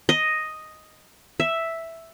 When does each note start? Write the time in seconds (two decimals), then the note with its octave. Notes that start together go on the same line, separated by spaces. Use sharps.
0.09 D#5
1.40 E5